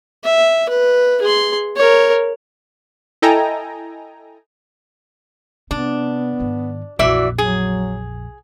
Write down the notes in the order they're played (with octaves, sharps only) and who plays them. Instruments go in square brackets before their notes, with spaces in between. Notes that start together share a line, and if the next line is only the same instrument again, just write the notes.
[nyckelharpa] E5
B4
G#4 C6
A#4 C#5
[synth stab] E4 A4 D#5 G5 G#5 A#5
[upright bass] C3 [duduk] B3 [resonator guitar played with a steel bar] D4
[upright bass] G#2 D#3
[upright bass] A#1 F2 [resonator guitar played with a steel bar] E3 D5 E5 [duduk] F#4
[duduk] F#3 [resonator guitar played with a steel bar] G#4